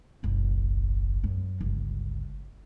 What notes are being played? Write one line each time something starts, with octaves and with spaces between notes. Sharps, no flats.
F#1 B1
F#2
G1 C#2